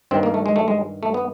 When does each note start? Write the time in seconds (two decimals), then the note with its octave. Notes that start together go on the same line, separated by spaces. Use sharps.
0.11 G2 D#3 C4
0.23 A#3
0.34 A3
0.46 G#3
0.56 A3
0.68 G#3
1.03 A3
1.14 B3